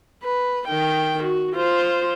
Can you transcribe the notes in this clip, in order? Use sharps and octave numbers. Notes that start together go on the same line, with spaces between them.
B4
D#3 G5
F#4
F4 C5